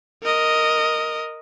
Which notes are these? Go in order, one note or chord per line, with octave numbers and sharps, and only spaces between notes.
A#4 D#5